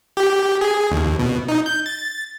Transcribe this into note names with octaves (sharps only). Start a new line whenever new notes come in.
G4
G#4
D#2
B2
D#4
G6
A6